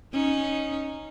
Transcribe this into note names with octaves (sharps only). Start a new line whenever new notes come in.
C#4 D#4